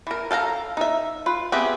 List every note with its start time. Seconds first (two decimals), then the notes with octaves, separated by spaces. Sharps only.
0.07 E3 A#4
0.31 A4 F5 G5 A#5
0.77 D#4 E5
1.26 F4 B4
1.52 B3 C4 G4 G#4 E5